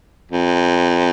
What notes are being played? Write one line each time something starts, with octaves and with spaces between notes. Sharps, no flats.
F2